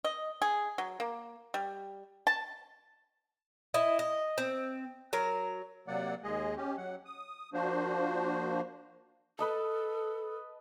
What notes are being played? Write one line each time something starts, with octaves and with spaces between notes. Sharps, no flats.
D#5
G#4
F#3
A#3
G3
A5
E4 D#5
D#5
C4
F#3 A#4
C3 F#3 A#3 D5 F#5
D#2 G#3 G#4 D#5
C#4 G4
F#3 F#5
D#6
F3 A#3 D4 F#4 C5
A4 B4 D#5 A5